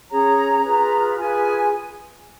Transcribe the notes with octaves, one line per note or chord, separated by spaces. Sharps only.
C#4 G#4 C#5 A#5
F4 G#4 B4
F4 G#4 B4 G#5